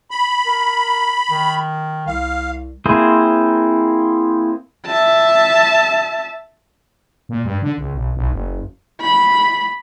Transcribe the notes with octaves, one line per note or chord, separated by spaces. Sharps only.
B5
A#4
D#3
C2 F5
A#3 C4 E4 G#4 C5
E5 A5
A#2
G2
D3
C#2
B1
B1
F#1
B5